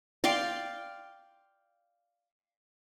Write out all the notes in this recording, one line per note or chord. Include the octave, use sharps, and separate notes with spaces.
D5 F5 G5 C6